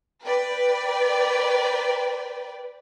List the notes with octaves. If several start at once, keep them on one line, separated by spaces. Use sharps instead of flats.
B4 D5 G5